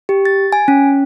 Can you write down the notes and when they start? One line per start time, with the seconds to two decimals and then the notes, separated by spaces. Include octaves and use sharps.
0.09 G4
0.25 A6
0.53 G#5
0.68 C#4